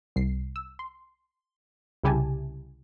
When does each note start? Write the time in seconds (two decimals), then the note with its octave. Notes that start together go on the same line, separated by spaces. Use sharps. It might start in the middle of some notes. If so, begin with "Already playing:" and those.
0.16 C2 C7
0.56 E6
0.79 C6
2.04 C2 C#3 E4 G4 G#5 A5